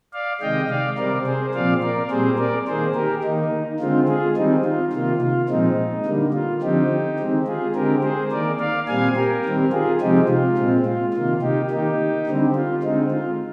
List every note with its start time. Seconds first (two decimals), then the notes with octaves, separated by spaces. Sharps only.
0.13 D5 F5
0.41 C3 D#3 G#3 D#5 G5
0.69 D5 F5
0.98 C3 G3 C4 A#4 D5
1.26 G#4 C5
1.54 A#2 F3 C4 D5 F5
1.83 A#4 D5
2.10 A#2 G3 C4 G#4 C5
2.38 A#4 D5
2.67 D#3 A#3 G#4 C5
2.95 G4 A#4
3.23 D#3 A#3 D#4
3.80 D3 G#3 C4 F4
4.08 F4 G#4
4.37 D#3 G3 C4 D#4
4.65 F4
4.93 C3 D#3 A#3 F4
5.22 F4
5.49 A#2 F3 G#3 C4 D#4
6.06 D3 G3 A#3
6.34 F4
6.62 D3 F3 C4 D#4 G4
7.19 D#3 G#3 C4
7.47 F4 G#4
7.75 D3 G#3 C4 G4 A#4
8.03 G#4 C5
8.31 D#3 A#3 A#4 D5
8.60 D5 F5
8.88 A#2 G3 C4 F5 G#5
9.16 G4 A#4
9.45 D#3 G3 C4
9.72 F4 G#4
10.01 C3 F3 G#3 C4 D#4 G4
10.29 F4
10.57 A#2 G#3 C4
10.86 F4
11.14 C3 D#3 A#3 F4
11.42 D#4 G4
11.70 D#3 A#3 D#4 G4
12.27 D3 G3 C4
12.56 F4
12.83 D3 G#3 C4 D#4
13.11 F4